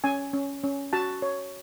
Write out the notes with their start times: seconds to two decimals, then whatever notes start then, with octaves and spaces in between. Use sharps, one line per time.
0.04 C#4 G#5
0.33 C#4
0.64 C#4
0.93 F#4 A5
1.22 C#5